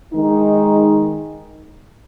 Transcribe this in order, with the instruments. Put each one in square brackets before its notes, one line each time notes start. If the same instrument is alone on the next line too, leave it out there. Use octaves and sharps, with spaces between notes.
[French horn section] D#3 G#3 D#4